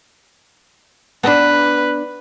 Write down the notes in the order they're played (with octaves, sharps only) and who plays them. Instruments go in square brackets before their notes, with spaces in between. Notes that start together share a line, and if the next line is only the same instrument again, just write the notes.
[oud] B3 D4 [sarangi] B4